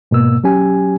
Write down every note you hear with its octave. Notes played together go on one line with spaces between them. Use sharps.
G#2 B2 A#3 E6
F#3 C#4 G4 G#5